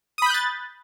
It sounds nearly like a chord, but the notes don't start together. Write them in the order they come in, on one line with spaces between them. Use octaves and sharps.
D#6 B5 G6 F#6 A6